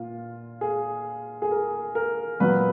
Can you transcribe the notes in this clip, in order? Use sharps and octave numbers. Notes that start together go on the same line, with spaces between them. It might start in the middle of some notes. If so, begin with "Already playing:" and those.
Already playing: A#2 F4
G#4
G#4
A#4
A#4
A#2 F#3 B3 B4